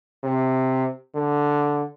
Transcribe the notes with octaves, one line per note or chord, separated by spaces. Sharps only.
C3
D3